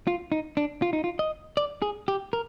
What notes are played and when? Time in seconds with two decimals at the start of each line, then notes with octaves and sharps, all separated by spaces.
0.07 F4
0.32 D#4
0.57 D4
0.82 F4
0.93 D#4
1.04 F4
1.19 D#5
1.57 D5
1.82 G#4
2.08 G4
2.33 A#4